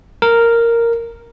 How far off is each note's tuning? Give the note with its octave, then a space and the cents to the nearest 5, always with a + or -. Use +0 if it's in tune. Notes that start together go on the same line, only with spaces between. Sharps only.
A#4 -5